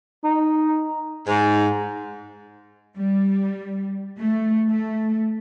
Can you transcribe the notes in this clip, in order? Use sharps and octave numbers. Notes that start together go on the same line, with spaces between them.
D#4
G#2
G3
A3
A3